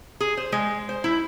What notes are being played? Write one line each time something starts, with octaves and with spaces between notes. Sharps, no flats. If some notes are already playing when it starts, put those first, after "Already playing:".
G#4
C5
G#3
C5
E4